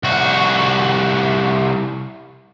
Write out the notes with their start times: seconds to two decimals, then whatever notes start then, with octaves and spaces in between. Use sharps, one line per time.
0.03 C2 F#4